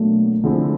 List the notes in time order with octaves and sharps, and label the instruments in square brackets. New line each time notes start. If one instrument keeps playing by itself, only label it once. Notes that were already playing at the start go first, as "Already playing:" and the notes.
Already playing: [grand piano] B2 F#3 A#3 D4 [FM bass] A3
[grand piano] D3 F3 G#3 C4 E4